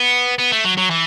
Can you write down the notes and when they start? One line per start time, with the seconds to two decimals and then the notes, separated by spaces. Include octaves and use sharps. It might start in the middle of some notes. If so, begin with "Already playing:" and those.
Already playing: B3
0.39 B3
0.52 A3
0.64 F#3
0.77 F#3
0.90 E3